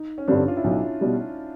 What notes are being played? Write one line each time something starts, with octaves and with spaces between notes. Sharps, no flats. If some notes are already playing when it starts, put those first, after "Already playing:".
Already playing: D#4
C#4
G2 D3 G3 C4 D4
F4
E4
B1 D#4
B2 G3